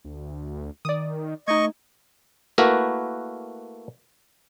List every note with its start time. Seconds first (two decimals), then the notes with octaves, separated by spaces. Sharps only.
0.05 D2
0.85 D#3 D5 D#6
1.48 A3 D#4 D#5 C#6 G#6
2.58 A3 A#3 E4 F#4 A#4 B4